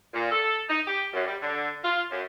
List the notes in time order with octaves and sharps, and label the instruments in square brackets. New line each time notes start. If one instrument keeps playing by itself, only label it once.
[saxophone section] A#2
A4
D#4
G4
F#2
G3
D3
F4
F#2